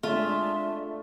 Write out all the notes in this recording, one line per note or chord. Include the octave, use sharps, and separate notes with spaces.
G#3 A3 D4 F4 E5